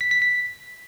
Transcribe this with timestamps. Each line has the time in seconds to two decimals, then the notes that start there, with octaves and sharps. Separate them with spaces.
0.01 B6
0.11 B6
0.22 B6